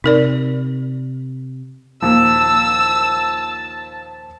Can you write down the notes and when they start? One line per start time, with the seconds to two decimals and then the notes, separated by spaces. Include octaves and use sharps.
0.04 C3 D#4 A#4 D5
2.02 D#2 A#2 F3 A5 E6